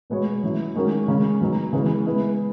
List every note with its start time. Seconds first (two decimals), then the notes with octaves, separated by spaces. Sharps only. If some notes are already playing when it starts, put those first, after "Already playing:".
0.10 B2 G#3 B3 F#4 C#5
0.44 F#3 C#4 E4
0.76 D#3 G#3 C#4 F#4 A#4
1.08 C#3 G#3 C#4
1.41 F#3 B3 D#4
1.73 C#3 E3 G#3 B3
2.06 G#3 B3 E4 B4